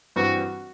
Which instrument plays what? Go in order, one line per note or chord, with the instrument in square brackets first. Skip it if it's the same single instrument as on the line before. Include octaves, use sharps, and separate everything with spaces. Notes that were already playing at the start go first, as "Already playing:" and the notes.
[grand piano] G2 E3 G3 C4 [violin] F#4